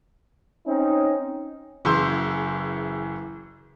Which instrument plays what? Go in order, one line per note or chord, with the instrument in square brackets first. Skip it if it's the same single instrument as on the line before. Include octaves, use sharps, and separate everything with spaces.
[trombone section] C4 C#4 D#4
[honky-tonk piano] F#1 E3 G#4 C6 E6 G6